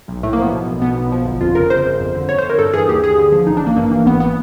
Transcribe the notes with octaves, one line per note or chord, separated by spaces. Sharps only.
B1
A2 A3
A#3
F3 B3
B2
B1
B2 B3
B1
F3
G1
F2 F4
C#3 A#4
G1 C5
G1
F2
D3
G1 C#5
C5
G1
A#4
G2 A4
E3 G#4
D#2 G4
D#2 G#4
D3
F3
A1 D#4
D4
A1 A#3
G2 A#3
E3 A#3
G#1 B3
B3